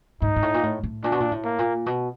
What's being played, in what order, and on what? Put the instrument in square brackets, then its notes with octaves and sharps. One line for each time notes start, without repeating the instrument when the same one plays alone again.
[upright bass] G#2 [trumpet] D#4
[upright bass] G#2
A2
A#2
A2
A2
[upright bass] A#2 [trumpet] D4
[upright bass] B2
A#2
A2
[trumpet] A#3
[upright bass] A#2
B2